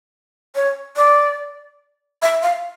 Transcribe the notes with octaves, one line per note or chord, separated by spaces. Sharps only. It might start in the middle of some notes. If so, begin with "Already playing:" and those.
C#5
D5
E5
F5